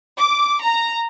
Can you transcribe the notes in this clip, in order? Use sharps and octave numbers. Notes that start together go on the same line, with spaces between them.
D6
A#5